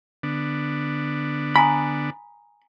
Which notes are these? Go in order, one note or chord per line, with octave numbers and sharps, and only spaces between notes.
D3 B3 D4
G#5 A#5 B5 D#6